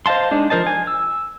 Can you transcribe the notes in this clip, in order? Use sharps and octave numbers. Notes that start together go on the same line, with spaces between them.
C5 D#5 F5 A5 C6
G#3 D4 D#4
F3 A#4 C5 D#5 A5
G#5
E6